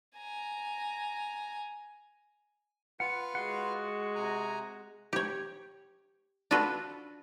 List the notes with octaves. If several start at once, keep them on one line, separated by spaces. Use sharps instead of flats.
G#5 A#5
F4 B4 F#5 F6
G#3 F#4 F#5 C6
C3 G#5 A#5
G4 C#5
D4 F4 F#4 A4 B4